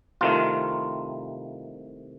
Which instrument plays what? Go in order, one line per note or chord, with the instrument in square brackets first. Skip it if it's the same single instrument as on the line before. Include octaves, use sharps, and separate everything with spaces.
[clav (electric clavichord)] C2 C3 D#3 A3 F4